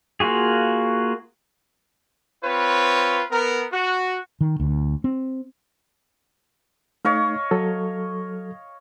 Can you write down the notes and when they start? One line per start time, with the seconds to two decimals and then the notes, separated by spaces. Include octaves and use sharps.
0.20 A#3 F4 F#4 G#4
2.43 C4 F4 B4 C#5
3.29 B3 A#4
3.71 F#4
4.41 D#3
4.60 D2
5.04 C4
7.05 A3 D#4 C#5 D#5 F5
7.51 F#3 A4